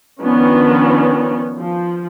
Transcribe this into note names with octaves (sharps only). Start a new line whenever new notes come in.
D#3 F3 B3 C#4 D4
F3